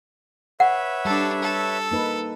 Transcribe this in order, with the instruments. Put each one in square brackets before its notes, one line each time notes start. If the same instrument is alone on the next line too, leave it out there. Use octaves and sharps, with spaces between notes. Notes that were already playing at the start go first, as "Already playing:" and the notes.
[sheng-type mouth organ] B4 C#5 E5 [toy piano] F#5
[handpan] G3 [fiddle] D4 A4
[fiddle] A4
[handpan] A#3 D#4 B4